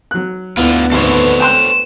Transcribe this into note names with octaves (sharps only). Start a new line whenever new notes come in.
F#3 F#6
D2 D3 B3 E4 F4
G#1 E2 A4 C5 C#5
G5 C6 F#6 E7